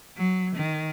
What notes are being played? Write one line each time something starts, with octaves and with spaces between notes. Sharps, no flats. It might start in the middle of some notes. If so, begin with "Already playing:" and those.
F#3
D#3